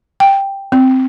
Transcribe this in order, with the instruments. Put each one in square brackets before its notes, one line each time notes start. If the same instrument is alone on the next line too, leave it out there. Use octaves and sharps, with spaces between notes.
[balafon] G5
C4